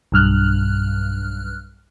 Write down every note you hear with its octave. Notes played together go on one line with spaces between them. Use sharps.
B1 G2 F6 F#6